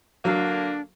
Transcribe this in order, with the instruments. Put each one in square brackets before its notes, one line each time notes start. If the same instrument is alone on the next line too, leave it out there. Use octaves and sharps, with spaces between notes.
[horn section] D3 A#3 [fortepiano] F#3 [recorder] D4